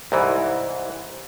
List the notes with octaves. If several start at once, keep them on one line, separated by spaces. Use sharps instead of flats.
C2 G#2 E3